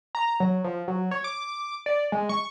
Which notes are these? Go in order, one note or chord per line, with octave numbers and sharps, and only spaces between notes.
A#5
F#3
F3
F#3
C#5
D6
D5
G#3
C#6